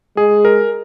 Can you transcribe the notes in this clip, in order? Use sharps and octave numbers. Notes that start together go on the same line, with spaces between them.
G#3 G#4
A#4